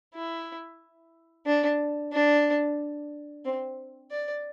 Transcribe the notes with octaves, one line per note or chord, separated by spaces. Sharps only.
E4
D4
D4
C4
D5